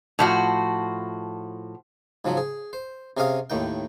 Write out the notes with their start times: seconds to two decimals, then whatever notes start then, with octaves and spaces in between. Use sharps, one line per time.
0.19 A2 F3 F#4
2.25 G#2 C#3 F3 F#3
2.37 G#4
2.73 C5
3.17 C3 C#4 G#4 D#5 F5 D#6
3.50 D#2 A2 D#3 G5